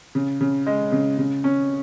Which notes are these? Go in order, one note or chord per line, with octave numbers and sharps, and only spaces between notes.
C#3
C#3
G#3
C#3
C#3
C#4